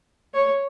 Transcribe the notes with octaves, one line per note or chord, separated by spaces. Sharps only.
C#5